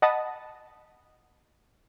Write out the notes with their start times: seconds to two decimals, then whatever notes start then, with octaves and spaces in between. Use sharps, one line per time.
0.02 D#5 F#5 A5 B5 D#6